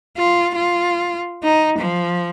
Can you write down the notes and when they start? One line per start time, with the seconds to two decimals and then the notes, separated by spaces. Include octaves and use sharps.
0.18 F4
0.56 F4
1.44 D#4
1.78 F3